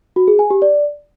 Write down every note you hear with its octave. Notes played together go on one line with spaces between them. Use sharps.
F#4
G#4
G#5
G4
D5